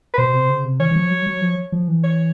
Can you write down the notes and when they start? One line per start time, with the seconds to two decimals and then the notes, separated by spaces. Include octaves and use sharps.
0.13 B4
0.18 B2 C5
0.33 C3
0.49 C#3
0.64 C3
0.80 E3 C#5
0.91 E3
0.96 F3
1.11 F#3
1.26 F#3
1.41 F3
1.72 F3
1.88 E3
2.04 C#5